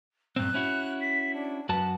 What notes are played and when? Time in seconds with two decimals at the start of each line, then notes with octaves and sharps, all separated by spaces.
0.36 G2 A#2 C4 F#6
0.54 C#4 E4 F#4
1.01 B6
1.34 D4
1.69 F#2 F#4 B4 A5